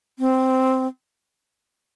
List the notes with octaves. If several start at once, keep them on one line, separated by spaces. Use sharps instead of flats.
C4